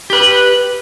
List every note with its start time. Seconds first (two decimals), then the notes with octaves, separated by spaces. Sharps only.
0.10 G4 B4